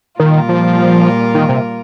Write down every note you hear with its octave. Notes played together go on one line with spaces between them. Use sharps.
A#2 D#3 G3 A#3 F4 A#4
F3
D#3
C3